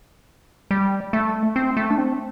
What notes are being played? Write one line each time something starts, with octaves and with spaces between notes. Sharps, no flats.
G3
A3
C4
A3
D4
C4